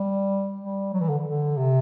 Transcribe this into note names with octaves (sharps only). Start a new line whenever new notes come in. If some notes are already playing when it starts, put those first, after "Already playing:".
Already playing: G3
G3
F#3
E3
D3
D3
C3